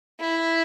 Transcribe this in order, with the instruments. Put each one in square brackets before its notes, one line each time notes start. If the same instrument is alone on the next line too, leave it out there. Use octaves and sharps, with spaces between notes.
[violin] E4